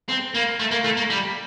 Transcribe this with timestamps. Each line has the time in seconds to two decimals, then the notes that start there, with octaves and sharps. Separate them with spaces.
0.09 C4
0.34 A#3
0.59 A3
0.71 A#3
0.84 A3
0.97 A#3
1.10 G3